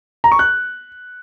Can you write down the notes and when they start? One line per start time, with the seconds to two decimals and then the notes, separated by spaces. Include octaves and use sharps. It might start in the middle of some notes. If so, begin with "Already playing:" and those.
0.24 A#5
0.32 C#6
0.39 F#6